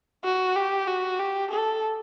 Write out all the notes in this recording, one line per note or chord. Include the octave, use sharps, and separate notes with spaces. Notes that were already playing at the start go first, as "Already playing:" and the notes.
F#4
G4
F#4
G4
A4